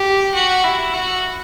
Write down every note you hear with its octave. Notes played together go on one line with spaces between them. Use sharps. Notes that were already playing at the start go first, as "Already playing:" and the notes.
Already playing: G4
F#4
E4
F#4